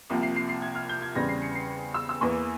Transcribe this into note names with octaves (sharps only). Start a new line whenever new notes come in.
C2 C3 F3 A#3
C7
C7
C7
G#6
F6
G6
G#6
E2 C#3 G3 C4 A#6
C7
C#7
C7
E6
E6
E2 E3 A#3 C#6